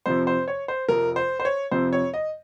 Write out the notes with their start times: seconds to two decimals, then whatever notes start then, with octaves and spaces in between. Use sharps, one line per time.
0.06 F2 C3 F3 C5
0.27 C5
0.48 C#5
0.68 C5
0.89 F2 C3 F3 A#4
1.16 C5
1.40 C5
1.45 C#5
1.71 F2 C3 F3 C5
1.93 C#5
2.14 D#5